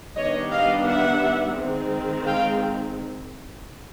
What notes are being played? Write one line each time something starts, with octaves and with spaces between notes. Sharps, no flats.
D#3 G3 B3 D4 C#5 D#5
D#5 F5
E5 F#5
D#3 G#3 C4
F5 G5